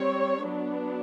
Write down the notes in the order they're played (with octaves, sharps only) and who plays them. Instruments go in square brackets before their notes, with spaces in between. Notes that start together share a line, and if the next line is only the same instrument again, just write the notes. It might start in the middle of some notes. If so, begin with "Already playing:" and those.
Already playing: [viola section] G3 C4 C#5
F#3 B3 D4